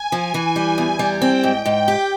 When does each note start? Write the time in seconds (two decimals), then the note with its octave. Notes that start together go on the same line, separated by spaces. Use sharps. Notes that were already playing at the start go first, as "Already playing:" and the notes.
Already playing: G#5
0.12 F3
0.34 E3
0.56 G3
0.78 E2
0.99 G3
1.21 C4 G5
1.43 G#2
1.65 G#2 G5
1.88 G4